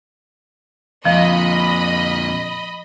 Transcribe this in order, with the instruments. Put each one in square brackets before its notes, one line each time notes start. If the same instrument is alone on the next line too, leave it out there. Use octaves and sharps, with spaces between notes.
[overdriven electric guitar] F2 A#2 [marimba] F3 [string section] D#5 B5